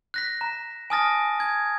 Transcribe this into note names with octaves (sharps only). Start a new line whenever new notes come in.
F#6 A#6 B6
A#5
G#5 A5 D#6 F6 A6 A#6
G#6